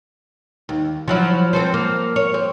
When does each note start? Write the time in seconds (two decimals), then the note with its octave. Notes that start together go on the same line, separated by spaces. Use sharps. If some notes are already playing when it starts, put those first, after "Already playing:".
0.69 D#2
1.08 F3 F#3 E4
1.53 C4 A4 C5
1.74 A#3
2.16 C#5
2.34 C4